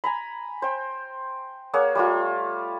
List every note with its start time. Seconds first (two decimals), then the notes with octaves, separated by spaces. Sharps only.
0.04 G#5 A#5 B5
0.62 C5 G5
1.74 A#3 G#4 C#5 F#5
1.95 G3 A3 F4